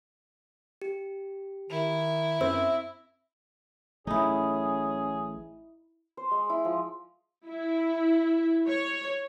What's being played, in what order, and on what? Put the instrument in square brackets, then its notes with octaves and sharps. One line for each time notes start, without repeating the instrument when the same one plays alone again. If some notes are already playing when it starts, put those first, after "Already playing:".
[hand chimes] G4
[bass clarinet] D#3 [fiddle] E4
[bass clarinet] F#2 [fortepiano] C4 [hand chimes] E5 E6
[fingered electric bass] A1 F#3 A3 [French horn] C#4 [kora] D#4 E4 [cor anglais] G#4
[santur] C5
G#3
E4
F3
[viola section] E4
C#5